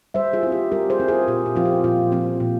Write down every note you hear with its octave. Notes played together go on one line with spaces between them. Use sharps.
G3 C5 E5
F4 G#4
C4 E4
G4
G3 G4 A#4
G#4 C5
C4 E4
F4 G#4
A#2 G4
G4
F3 C4 F4
G4
A#2 F4
F3 C4 F4
A#2